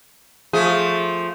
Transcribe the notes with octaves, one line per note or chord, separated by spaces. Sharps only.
F3 A3 G#4